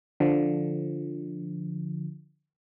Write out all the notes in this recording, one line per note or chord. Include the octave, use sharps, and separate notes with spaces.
D3 F3